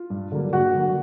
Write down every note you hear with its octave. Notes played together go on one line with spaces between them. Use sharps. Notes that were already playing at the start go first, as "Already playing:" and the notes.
Already playing: F4
G2
D3 F#3 A#3
G2 F#4 F#5
D3 F#3 A#3